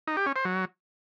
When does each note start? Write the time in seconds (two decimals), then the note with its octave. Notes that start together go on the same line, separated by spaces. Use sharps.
0.08 D#4
0.17 G4
0.26 C#4
0.36 C5
0.45 F#3